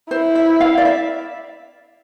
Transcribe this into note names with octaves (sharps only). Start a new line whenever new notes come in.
E4 C5
E5
F5
D5
E5